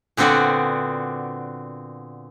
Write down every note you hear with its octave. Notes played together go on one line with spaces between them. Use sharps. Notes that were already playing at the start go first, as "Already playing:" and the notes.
A#2 D3 B3 C4 F#4 D5